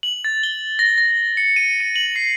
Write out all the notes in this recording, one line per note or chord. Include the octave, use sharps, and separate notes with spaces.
F#7
A6
G7
A#6
A#6
C#7
D#7
D#7
F#7
C7